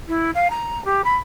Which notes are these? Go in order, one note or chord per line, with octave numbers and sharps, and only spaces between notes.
E4
F5
A#5
G4
B5